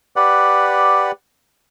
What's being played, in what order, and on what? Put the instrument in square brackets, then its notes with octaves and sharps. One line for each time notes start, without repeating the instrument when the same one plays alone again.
[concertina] G4 B4 D5 F#5